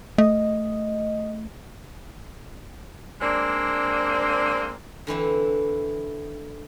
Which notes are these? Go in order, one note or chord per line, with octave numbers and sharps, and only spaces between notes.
A3 D#5
G#3 A#3 C4 D4
D3 E3 C4 E4